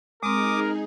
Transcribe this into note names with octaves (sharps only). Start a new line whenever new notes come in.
G#3 C4 D#4 G#4 A#4 D6 D#6